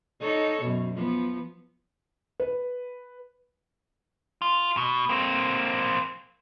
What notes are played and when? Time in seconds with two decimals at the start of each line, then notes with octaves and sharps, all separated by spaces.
0.20 D#4 A4 C#5
0.62 F#2 B2
0.94 F3 B3
2.40 B4
4.42 F4
4.77 B2
5.09 A#3 C4